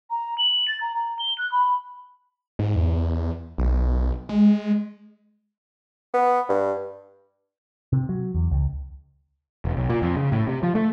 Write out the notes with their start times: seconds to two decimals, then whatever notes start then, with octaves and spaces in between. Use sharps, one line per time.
0.10 A#5
0.38 F#7
0.67 A6
0.80 A#5
0.95 A#5
1.19 G7
1.38 F#6
1.51 B5
2.59 G#2
2.76 E2
3.58 B1
4.29 G#3
6.14 B3
6.49 G2
7.93 C3
8.09 F#3
8.35 E2
8.51 C#2
9.65 E1
9.77 B1
9.89 A#2
10.02 F2
10.16 C#3
10.32 A2
10.47 C3
10.63 F3
10.75 A3